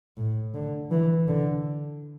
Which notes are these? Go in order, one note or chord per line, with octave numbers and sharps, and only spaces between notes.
A2
D3
E3
D3